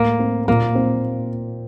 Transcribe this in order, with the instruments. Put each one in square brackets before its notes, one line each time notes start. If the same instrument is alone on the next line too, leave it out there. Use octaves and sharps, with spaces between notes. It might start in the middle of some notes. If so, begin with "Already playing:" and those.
Already playing: [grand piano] A2 [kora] A#3
[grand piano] C4
[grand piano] A#2 [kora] A#3
[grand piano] C4